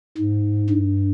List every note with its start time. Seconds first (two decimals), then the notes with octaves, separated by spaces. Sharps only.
0.17 G#2
0.70 G2